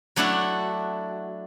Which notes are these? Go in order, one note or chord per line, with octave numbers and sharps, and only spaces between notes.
F#3 A3 D4 E4 F#4